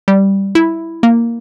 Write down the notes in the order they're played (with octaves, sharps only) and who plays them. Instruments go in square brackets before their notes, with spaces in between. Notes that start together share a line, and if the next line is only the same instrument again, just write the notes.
[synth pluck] G3
E4
A#3